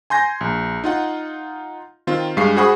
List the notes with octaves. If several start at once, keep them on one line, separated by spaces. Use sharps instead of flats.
G#5 C6 G6 A#6
A#1
D#4 F4 F#5
D#3 C4 F4
G2 G#3 F5 C7
F#4 G#4 C5 F#5 B5 D#6